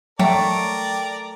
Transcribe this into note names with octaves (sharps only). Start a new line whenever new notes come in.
F#3 A3 A#4 D5 G5 A#5